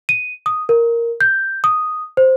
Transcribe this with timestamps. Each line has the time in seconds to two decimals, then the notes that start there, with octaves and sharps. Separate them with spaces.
0.09 D#7
0.46 D#6
0.69 A#4
1.21 G6
1.64 D#6
2.17 C5